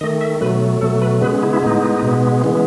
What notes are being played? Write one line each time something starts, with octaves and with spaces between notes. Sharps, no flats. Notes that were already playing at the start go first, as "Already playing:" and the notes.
D#3 A3 D#5
E5
B2 F#3 A3 B4
B2 F#3 A3 A4
B4
C#3 G#3 B3 B4
C#4
E4
E4
A2 G#3 B3 D#4
B2 G#3 B3
C#3 E3 G#3 B3